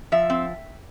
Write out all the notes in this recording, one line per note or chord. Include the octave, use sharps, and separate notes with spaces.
F3 E5
C4